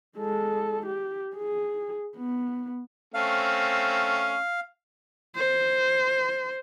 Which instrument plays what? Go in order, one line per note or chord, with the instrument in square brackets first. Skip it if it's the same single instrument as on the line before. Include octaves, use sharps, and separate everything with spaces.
[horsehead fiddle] G#3 A4
G4
G#4
B3
[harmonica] A3 C4 C#4 [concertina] F5
[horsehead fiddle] C5